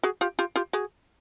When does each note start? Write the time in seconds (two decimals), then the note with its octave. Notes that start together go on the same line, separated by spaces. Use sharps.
0.03 F#4 G#4
0.21 F4 G4
0.39 F4 G4
0.56 F4 G4
0.73 F#4 G#4